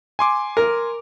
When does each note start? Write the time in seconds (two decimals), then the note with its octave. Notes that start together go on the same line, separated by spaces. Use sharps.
0.19 G#5 C6 D6
0.57 A#4